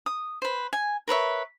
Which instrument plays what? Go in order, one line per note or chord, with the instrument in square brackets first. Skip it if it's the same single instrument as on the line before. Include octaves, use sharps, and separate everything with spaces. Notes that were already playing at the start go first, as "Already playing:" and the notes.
[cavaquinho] D#6
B4 C5
G#5
A#4 B4 C#5 E5